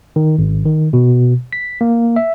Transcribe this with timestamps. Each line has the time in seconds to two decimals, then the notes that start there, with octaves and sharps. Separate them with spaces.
0.16 D#3
0.38 G#1
0.65 D#3
0.93 B2
1.53 B6
1.81 A#3
2.16 E5